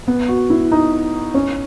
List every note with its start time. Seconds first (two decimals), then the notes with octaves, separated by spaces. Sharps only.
0.08 B3
0.28 F#4
0.50 E4
0.72 D#4
1.34 C#4